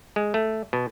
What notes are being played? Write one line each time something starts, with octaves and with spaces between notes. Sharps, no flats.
G#3
A3
B2